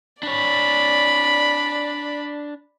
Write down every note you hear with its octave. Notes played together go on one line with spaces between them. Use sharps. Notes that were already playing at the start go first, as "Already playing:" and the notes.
D4 C#5 D5 B5